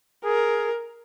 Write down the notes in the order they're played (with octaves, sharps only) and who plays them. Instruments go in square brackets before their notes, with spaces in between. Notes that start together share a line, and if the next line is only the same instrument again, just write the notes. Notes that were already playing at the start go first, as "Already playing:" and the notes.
[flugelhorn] G#4 [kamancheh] A#4